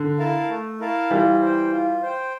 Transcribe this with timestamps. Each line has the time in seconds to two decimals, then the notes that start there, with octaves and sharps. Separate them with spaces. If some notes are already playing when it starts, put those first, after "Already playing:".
Already playing: D3
0.18 E4 A#4 F5 A5
0.50 A3
0.80 E4 A#4 F5 A5
1.10 E3 G3 F4
1.41 C5
1.46 G5
1.72 F4
2.02 C5 G5